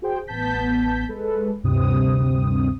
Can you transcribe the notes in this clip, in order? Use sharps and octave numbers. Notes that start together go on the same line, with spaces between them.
F#4 G#4 C5 G5
A1 B3 A5 G6 B6
G#3 A4 B4
D2 G2 C3 C4 D#6